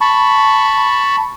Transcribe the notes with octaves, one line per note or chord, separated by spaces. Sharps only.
A5 B5 C#6